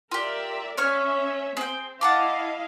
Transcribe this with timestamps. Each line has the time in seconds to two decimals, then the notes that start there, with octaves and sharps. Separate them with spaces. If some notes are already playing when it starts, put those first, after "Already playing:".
0.11 F4 G4 A#4 D5 E5
0.77 C#4 C#5 E5 C#6 F6
1.57 C4 G#4 G5
2.01 E4 D#5 F5 F#5 A5 D6